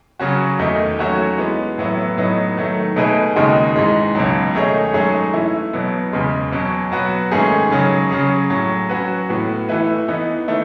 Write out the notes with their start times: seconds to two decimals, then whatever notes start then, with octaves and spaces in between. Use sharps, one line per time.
0.20 C#3 F#3 C#4 F#4
0.59 E2 D#3 A3 D#4
0.99 F#3 A3 C#4 F#4 C#5
1.38 E3 G#3 B3
1.78 A2 F#3 B3 E4
2.17 A2 F#3 B3 D#4
2.57 D#3 F#3 A3
2.96 B2 A3 D#4 G#4 B4
3.36 D#2 C#3 G#3 D#4 F#4
3.76 G#2 E3 G#3
4.15 C#2 B2 F#3
4.54 D#3 A3 D#4 G#4 C#5
4.94 G#2 F#3 A3 C#4 G#4
5.34 E3 A3 E4
5.73 B2 F#3 B3
6.13 E2 C#3 G#3
6.52 B2 F#3 C#4
6.92 F#3 B3 F#4 B4
7.31 G#2 D#3 A3 C#4 G#4
7.71 C#3 F#3 C#4 G#4
8.11 C#3 F#3 C#4 G#4
8.50 A2 F#3 C#4
8.89 F#3 C#4 F#4 B4
9.29 A2 E3 B3 F#4
9.69 E3 A3 E4 B4
10.08 E3 B3 D#4
10.48 D#3 A3 E4